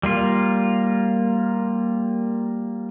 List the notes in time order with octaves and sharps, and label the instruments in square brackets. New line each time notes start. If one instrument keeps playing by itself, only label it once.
[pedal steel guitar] G3 A#3 F4